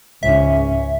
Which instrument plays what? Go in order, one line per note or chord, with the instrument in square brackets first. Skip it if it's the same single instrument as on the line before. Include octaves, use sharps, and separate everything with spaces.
[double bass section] C#2 G#2 C#4 [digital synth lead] E5